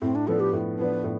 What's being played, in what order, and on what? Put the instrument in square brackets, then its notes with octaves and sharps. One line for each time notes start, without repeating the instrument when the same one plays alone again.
[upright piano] A2 [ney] C4
[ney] D4
[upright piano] F3 B3 D4 [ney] A4
[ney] G4
[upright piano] A2
[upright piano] F3 B3 D4 [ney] B4
[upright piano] A2